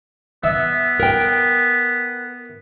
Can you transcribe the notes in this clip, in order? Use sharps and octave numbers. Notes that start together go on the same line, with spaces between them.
B3 E5
A#4 G5